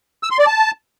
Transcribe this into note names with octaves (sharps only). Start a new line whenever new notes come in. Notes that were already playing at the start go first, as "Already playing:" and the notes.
E6
C6
D5
A5